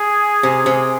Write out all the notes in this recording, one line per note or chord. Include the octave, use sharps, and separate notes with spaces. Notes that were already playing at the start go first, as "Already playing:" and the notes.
Already playing: G#4
C3
C3